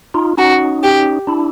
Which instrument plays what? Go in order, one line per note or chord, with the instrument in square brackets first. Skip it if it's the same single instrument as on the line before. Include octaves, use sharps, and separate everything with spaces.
[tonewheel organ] D#4 F4
[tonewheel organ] C#4 D#4 [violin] F#4
[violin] G4
[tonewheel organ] D4 E4